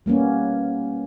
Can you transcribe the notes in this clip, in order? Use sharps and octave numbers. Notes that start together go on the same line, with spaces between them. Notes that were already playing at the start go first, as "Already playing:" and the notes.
G3 A#3 B3 C#4